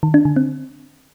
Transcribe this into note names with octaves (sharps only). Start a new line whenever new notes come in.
D#3
D4
D3
C4